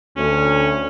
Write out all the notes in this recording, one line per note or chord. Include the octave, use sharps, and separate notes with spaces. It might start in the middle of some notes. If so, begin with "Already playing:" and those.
D2 C#4